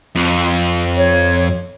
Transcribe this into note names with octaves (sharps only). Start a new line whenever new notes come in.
F2
C#5